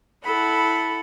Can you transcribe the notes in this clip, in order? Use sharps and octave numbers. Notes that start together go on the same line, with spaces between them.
E4 A4 F#5 B5